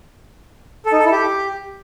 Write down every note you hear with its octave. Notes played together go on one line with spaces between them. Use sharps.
A4
D#4
A4
E4
G4